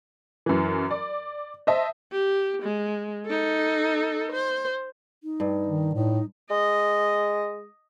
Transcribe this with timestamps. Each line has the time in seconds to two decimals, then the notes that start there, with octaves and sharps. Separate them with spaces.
0.46 F#2 E3
0.91 D5
1.67 C5 D#5 E5 A5
2.12 G4
2.62 G#3
3.26 D#4 A4
4.32 C5
5.23 D#4
5.40 G2
5.67 D#3
5.94 A2 D#4
6.51 G#3 D#5